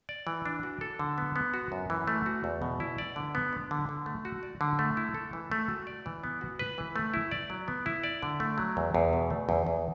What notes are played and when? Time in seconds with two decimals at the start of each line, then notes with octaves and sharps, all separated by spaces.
0.09 D5
0.27 E3
0.46 D4
0.63 F#4
0.81 A4
0.99 D3
1.18 B3
1.36 B3
1.54 F#4
1.72 F#2
1.90 E3
2.08 A3
2.26 F#4
2.44 E2
2.62 B2
2.80 E4
2.98 D5
3.16 D3
3.35 B3
3.53 D4
3.71 D3
3.89 D3
4.06 A3
4.25 F#4
4.43 D5
4.61 D3
4.79 A3
4.97 E4
5.14 A4
5.33 E3
5.52 A3
5.69 F#4
5.87 D5
6.06 E3
6.24 B3
6.41 F#4
6.59 B4
6.78 E3
6.96 A3
7.14 E4
7.31 D5
7.50 F#3
7.68 B3
7.86 E4
8.04 D5
8.22 D3
8.40 A3
8.58 F#3
8.77 E2
8.95 E2
9.13 B2
9.30 A3
9.49 E2
9.66 E2